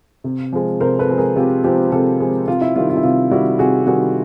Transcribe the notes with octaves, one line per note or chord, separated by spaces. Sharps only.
C3
F3 G#3
C3 A#4 C5
A4 B4
F3 G#3
G#4 A#4
C3 F4 G4
F3 G#3 F4 G4
C3 G4 A4
F3 G#3
C3 F4
E4
D#3 G3 F4
F4
E4
C3 F4
D#3 G3 E4 F#4
C3 F#4 G#4
D#3 G3 F#4 G#4